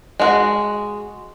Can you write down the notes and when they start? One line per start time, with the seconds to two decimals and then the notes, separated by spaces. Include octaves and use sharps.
0.20 G#3 F#4